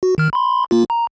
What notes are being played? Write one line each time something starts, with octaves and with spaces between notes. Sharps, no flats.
F#4
D#3 F6
B5 C6
A#3 F4
A#5